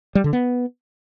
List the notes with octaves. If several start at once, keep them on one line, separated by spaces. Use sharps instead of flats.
G3
D3
B3